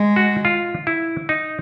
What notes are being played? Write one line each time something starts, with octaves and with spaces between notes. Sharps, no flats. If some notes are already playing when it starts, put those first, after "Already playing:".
Already playing: G#3
F#4
F4
E4
D#4